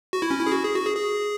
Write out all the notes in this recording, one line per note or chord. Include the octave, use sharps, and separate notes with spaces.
F#4
E4
C#4
E4
G#4
F#4
G#4
F#4
G#4
G#4